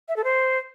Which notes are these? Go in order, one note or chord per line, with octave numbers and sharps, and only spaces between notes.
E5
A4
C5